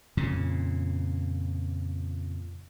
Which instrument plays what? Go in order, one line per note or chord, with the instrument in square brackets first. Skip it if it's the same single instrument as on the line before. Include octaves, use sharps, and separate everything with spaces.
[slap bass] F2 A#2 C#3